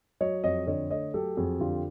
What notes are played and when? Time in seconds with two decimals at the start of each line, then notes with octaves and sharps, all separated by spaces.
0.21 F#3 C#5 D#5
0.44 F2 C#5 D#5
0.67 D3 C#5 D#5
0.90 A3 C#5 D#5
1.14 F#3 G4 A4
1.37 F2 F#4 G#4
1.60 D3 F4 G4